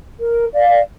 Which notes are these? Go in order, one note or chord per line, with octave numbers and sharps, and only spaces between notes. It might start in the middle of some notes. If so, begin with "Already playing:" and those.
A#4
D5 F5